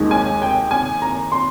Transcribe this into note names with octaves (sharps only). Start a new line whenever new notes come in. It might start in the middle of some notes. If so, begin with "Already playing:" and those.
Already playing: D#2 D#3 G#3
G#5
G5
G#5
A#5
C6